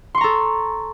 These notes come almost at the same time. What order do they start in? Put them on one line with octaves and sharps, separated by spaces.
C6 C#6 A#5 A4